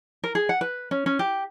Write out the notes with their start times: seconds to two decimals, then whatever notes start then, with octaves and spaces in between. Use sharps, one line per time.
0.24 A#4
0.35 G#4
0.49 F#5
0.61 B4
0.91 C#4
1.06 C#4
1.19 G4